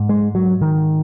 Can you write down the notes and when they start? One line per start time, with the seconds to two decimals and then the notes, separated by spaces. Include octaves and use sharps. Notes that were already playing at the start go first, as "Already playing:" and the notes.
Already playing: G#2
0.09 G#3
0.35 F#3
0.61 D#3